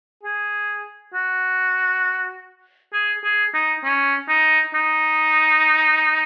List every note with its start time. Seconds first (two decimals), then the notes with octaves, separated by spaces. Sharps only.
0.23 G#4
1.14 F#4
2.93 G#4
3.24 G#4
3.54 D#4
3.84 C#4
4.28 D#4
4.74 D#4